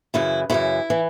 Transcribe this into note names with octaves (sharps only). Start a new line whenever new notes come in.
F#2 C#3 E3 E4
F#2 C#3 E3 E4
E3